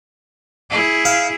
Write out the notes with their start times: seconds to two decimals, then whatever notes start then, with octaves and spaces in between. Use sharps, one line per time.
0.70 E4 G#4
1.05 F5